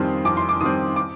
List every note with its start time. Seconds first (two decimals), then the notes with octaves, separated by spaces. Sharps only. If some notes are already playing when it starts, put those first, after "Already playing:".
Already playing: F2 D#3 G3 C4 C6
0.25 F2 D6
0.37 C6
0.49 D6
0.61 D#3 G3 C4 D#6
0.96 D6